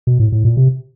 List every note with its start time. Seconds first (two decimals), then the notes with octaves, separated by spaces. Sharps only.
0.07 B2
0.20 A2
0.32 A2
0.45 A#2
0.57 C3